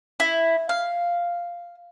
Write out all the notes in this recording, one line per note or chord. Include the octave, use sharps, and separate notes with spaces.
E4
F5